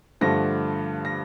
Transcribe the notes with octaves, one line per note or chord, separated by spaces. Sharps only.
G2 D3 F3 A3 A#6
A#6